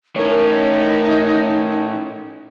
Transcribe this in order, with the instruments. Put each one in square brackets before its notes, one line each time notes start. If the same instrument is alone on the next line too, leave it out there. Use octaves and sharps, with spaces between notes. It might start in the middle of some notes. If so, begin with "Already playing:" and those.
[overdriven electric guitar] A2 C#4 [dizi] D#4 [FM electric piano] A#4 C#5